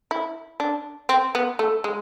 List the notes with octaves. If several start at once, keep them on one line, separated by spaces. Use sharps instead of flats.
E4
D4
C4
B3
A3
G#3